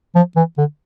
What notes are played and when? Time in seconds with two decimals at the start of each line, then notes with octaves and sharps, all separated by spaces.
0.15 F3
0.36 E3
0.58 D3